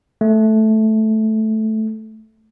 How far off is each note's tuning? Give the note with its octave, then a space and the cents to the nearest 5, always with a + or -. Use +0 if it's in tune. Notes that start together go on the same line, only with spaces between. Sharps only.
A3 -10